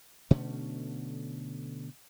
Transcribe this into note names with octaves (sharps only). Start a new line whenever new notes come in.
B2 D3 A3 C#4